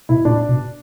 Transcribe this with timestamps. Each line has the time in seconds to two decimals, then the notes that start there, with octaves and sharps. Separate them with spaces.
0.09 B2 E4
0.25 A#2 D4
0.49 B2